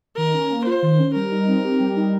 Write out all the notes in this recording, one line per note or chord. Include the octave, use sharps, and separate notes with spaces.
D#3 A#4
C#4
A#3
F4 C5
D#3
C#4
G3 A#4
D#4
C4
G4
G3
D#4